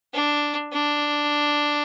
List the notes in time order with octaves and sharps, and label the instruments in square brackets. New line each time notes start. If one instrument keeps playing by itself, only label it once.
[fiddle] D4
D4